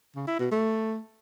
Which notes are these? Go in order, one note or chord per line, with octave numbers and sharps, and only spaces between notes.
C#3
E4
B2
A3